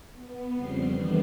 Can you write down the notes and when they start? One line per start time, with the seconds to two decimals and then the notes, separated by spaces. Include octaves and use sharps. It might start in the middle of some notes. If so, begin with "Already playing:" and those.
0.14 B3
0.55 F2 C#3 G3 C4 C7
0.92 D#3 E3 G3 A3 B3 D4